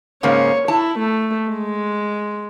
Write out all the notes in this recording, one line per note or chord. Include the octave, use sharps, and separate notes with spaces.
G#2 C#3 A#3 C#5
E4 A5
A3
G#3